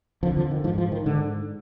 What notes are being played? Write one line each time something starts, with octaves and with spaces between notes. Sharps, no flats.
F2 D3 F3
F3
D#3
G#2 F3
F3
D#3
G#2 D3